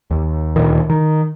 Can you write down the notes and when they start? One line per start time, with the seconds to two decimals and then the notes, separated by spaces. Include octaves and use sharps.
0.11 D#2
0.56 D2 A#2 D#3
0.90 D#3